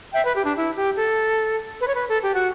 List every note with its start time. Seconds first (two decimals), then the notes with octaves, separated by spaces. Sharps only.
0.13 E5 G5
0.24 B4
0.34 G4
0.44 D4
0.55 E4
0.76 G4
0.97 A4
1.80 B4
1.87 C#5
1.94 B4
2.08 A4
2.21 G4
2.34 F#4